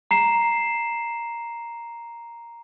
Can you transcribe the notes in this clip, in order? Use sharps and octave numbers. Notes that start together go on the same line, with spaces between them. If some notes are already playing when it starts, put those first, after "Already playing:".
A#5 C7 E7